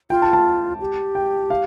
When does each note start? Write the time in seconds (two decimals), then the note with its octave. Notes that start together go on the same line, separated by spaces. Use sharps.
0.10 F4 G5
0.22 A5
0.33 A5
0.81 G4
1.15 G5
1.50 F5